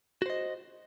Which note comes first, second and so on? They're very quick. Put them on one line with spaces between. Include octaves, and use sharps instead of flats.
F#4 C5 D#5